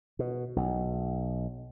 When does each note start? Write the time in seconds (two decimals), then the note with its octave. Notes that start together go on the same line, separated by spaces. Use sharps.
0.19 B2
0.56 B1